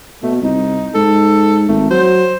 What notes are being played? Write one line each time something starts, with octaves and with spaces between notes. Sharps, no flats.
B2 A3
C2 D#4
G#2 A4
G#1 A3
F#3 C5